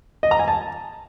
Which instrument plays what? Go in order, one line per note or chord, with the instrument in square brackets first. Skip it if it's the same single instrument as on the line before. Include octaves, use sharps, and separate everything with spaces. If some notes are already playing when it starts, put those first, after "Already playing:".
[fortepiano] D#5
A#5
G#5
A5